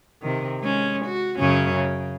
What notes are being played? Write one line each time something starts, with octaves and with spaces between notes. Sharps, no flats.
C3 D#3
G#3 C#4
F#4
F#2 C#3 C#4
C#3